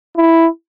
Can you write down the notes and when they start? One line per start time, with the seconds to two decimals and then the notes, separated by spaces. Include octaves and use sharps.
0.17 E4